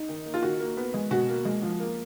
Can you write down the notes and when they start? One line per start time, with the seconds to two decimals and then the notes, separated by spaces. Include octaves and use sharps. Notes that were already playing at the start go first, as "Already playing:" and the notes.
Already playing: D#4
0.09 D#3
0.25 A#3
0.34 F4
0.42 D#3 F#4
0.60 A#3
0.77 B3
0.94 G#3
1.11 B2 F#4
1.29 A#3
1.45 G#3
1.63 F3
1.80 A#3